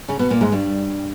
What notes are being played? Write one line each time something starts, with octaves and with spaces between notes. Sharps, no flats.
C#3 C#4
B2 B3
A#2 A#3
G#2 G#3
G2 G3